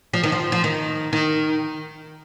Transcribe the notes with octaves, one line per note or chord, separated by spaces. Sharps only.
F3
D#3
F3
F3
D#3
D#3